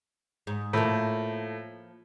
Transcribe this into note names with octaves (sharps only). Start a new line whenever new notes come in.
G#2
A2 F3 A#3